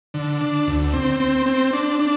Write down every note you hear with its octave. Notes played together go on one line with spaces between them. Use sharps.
D3
D4
D2
C4
C4
C4
D4
D4